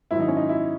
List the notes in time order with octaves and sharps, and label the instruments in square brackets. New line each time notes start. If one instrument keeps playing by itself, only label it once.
[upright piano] G#2 D#3 F#3 E4
D#4
C#4
D#4
E4